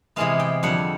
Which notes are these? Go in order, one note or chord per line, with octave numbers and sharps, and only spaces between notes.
C3 E3 G#3 B3 F5
G5
F2 D3 G3 C4 F#5